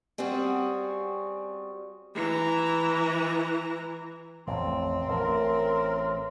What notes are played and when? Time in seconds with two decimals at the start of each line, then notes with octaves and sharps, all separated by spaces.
0.18 G3 C4 C#4 F#4 G#4
2.15 E3 A#5
4.47 A1 F2 C4
5.08 A1 A#4